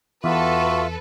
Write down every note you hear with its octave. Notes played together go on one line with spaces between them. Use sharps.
E2 F4 F#4 A4 B4 E5